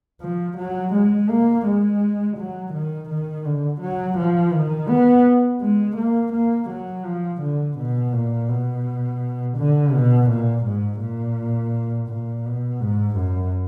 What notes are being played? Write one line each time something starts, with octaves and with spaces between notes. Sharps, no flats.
F3
F#3
G#3
A#3
G#3
F#3
D#3
D#3
D3
F#3
F3
D#3
B3
G#3
A#3
A#3
F#3
F3
D3
B2
A#2
B2
D3
B2
A#2
G#2
A#2
A#2
B2
G#2
F#2